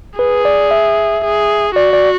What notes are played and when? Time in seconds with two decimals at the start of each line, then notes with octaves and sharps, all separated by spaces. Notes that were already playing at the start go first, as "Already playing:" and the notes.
0.19 G#4 B4
0.45 D5
0.71 E5
1.24 G#4
1.75 F#4 D5
1.93 D5